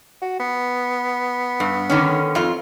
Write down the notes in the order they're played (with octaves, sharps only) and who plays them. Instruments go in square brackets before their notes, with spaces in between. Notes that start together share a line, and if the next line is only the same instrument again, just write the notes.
[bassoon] F#4
B3
[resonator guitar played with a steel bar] G2
D3 D#3 C#4
F2 F4